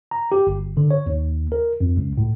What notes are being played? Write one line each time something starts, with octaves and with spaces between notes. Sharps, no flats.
A#5
G4
G1
D3
C#5
D#2
A#4
F2
C#2
A2